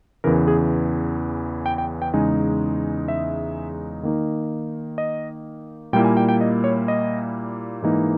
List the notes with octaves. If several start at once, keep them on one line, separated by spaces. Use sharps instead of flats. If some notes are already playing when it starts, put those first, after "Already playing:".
E2 C#3 E3 A#4
G#4
G5
G5
G5
E2 C#3 G#3 D#4 G#5
E5
D#3 A#3 D#4
D#5
A#2 G3 A#3 E4 G5
G#5
G5
G5
D#5
C#5
D#5
G#2 E3 A#3 D#4